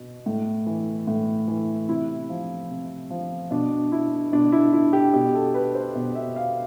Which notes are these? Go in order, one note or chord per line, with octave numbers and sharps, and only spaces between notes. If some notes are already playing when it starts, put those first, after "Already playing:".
Already playing: B2
A2
E3
A2
E3
C3 E4
F3
C3
F3
B2 D4
E4
B2 D4
E4
E4
G4
B2 G4
A4
B4
C5
B2
E5
F5